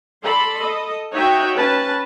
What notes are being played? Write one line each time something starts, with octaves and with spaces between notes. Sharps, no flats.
A4 D5 B5 C6
A4 D#5
D#4 F#4 C#5 E5 F#5 G5
C#4 B4 A5